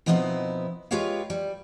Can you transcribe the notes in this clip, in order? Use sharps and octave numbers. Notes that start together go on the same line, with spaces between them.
B2 F3 B3 C4 D#4 E4
G#3 F4 G4 B4 C#5 F5
G3